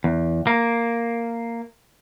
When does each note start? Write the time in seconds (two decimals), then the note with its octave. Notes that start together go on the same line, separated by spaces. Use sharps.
0.04 E2
0.47 A#3